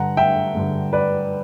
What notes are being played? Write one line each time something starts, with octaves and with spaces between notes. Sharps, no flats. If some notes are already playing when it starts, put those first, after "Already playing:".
Already playing: G2 D3 F#5 A#5
E5 G5
G2 D3
B4 D5